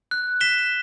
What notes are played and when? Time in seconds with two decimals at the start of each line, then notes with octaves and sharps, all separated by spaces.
0.11 F#6
0.41 B6 E7 G7